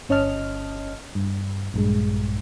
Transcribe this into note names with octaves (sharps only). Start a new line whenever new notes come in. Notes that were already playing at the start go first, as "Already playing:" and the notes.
G1 C#4 C#5 D#5 A5 F6
G2
A#1 G2 G#3